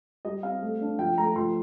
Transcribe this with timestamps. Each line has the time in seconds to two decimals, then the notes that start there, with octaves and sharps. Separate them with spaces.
0.25 G3 D#5
0.43 C4 F5
0.62 A3
0.81 D4
0.99 F3 G5
1.18 A3 A#5
1.36 F3 C6